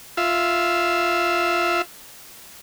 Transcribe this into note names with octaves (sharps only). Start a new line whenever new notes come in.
F4 E5